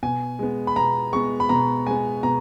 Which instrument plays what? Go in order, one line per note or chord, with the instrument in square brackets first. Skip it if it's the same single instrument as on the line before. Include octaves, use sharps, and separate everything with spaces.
[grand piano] B2 G#5
G#3 B3
B5
B2 A#5
G#3 B3 C#6
B5
B2 A#5
G#3 B3 G#5
B2 A#5